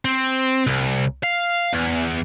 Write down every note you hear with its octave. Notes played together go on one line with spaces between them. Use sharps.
C4
C2
F5
E2